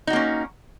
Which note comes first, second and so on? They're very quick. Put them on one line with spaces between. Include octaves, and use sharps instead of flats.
D#4 F#4 A#3 C#4